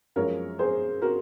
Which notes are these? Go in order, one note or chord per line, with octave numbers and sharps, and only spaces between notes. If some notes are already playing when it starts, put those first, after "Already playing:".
F#2 F3 G#3 A#4 C#5
G#4 C5
F#4 A#4